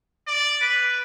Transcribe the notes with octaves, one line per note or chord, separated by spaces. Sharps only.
D5
B4